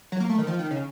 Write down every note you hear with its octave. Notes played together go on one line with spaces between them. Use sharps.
F#3
A#3
A3
D#3
F3
D#3
C#3